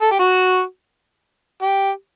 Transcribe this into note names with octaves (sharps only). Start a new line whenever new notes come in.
A4
G4
F#4
G4